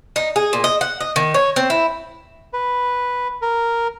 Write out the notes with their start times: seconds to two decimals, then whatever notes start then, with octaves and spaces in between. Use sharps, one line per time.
0.16 D#4
0.36 G#4
0.53 A#2
0.64 D#5
0.81 F#5
1.01 D#5
1.16 D#3
1.34 C#5
1.56 C4
1.70 E4
2.53 B4
3.42 A#4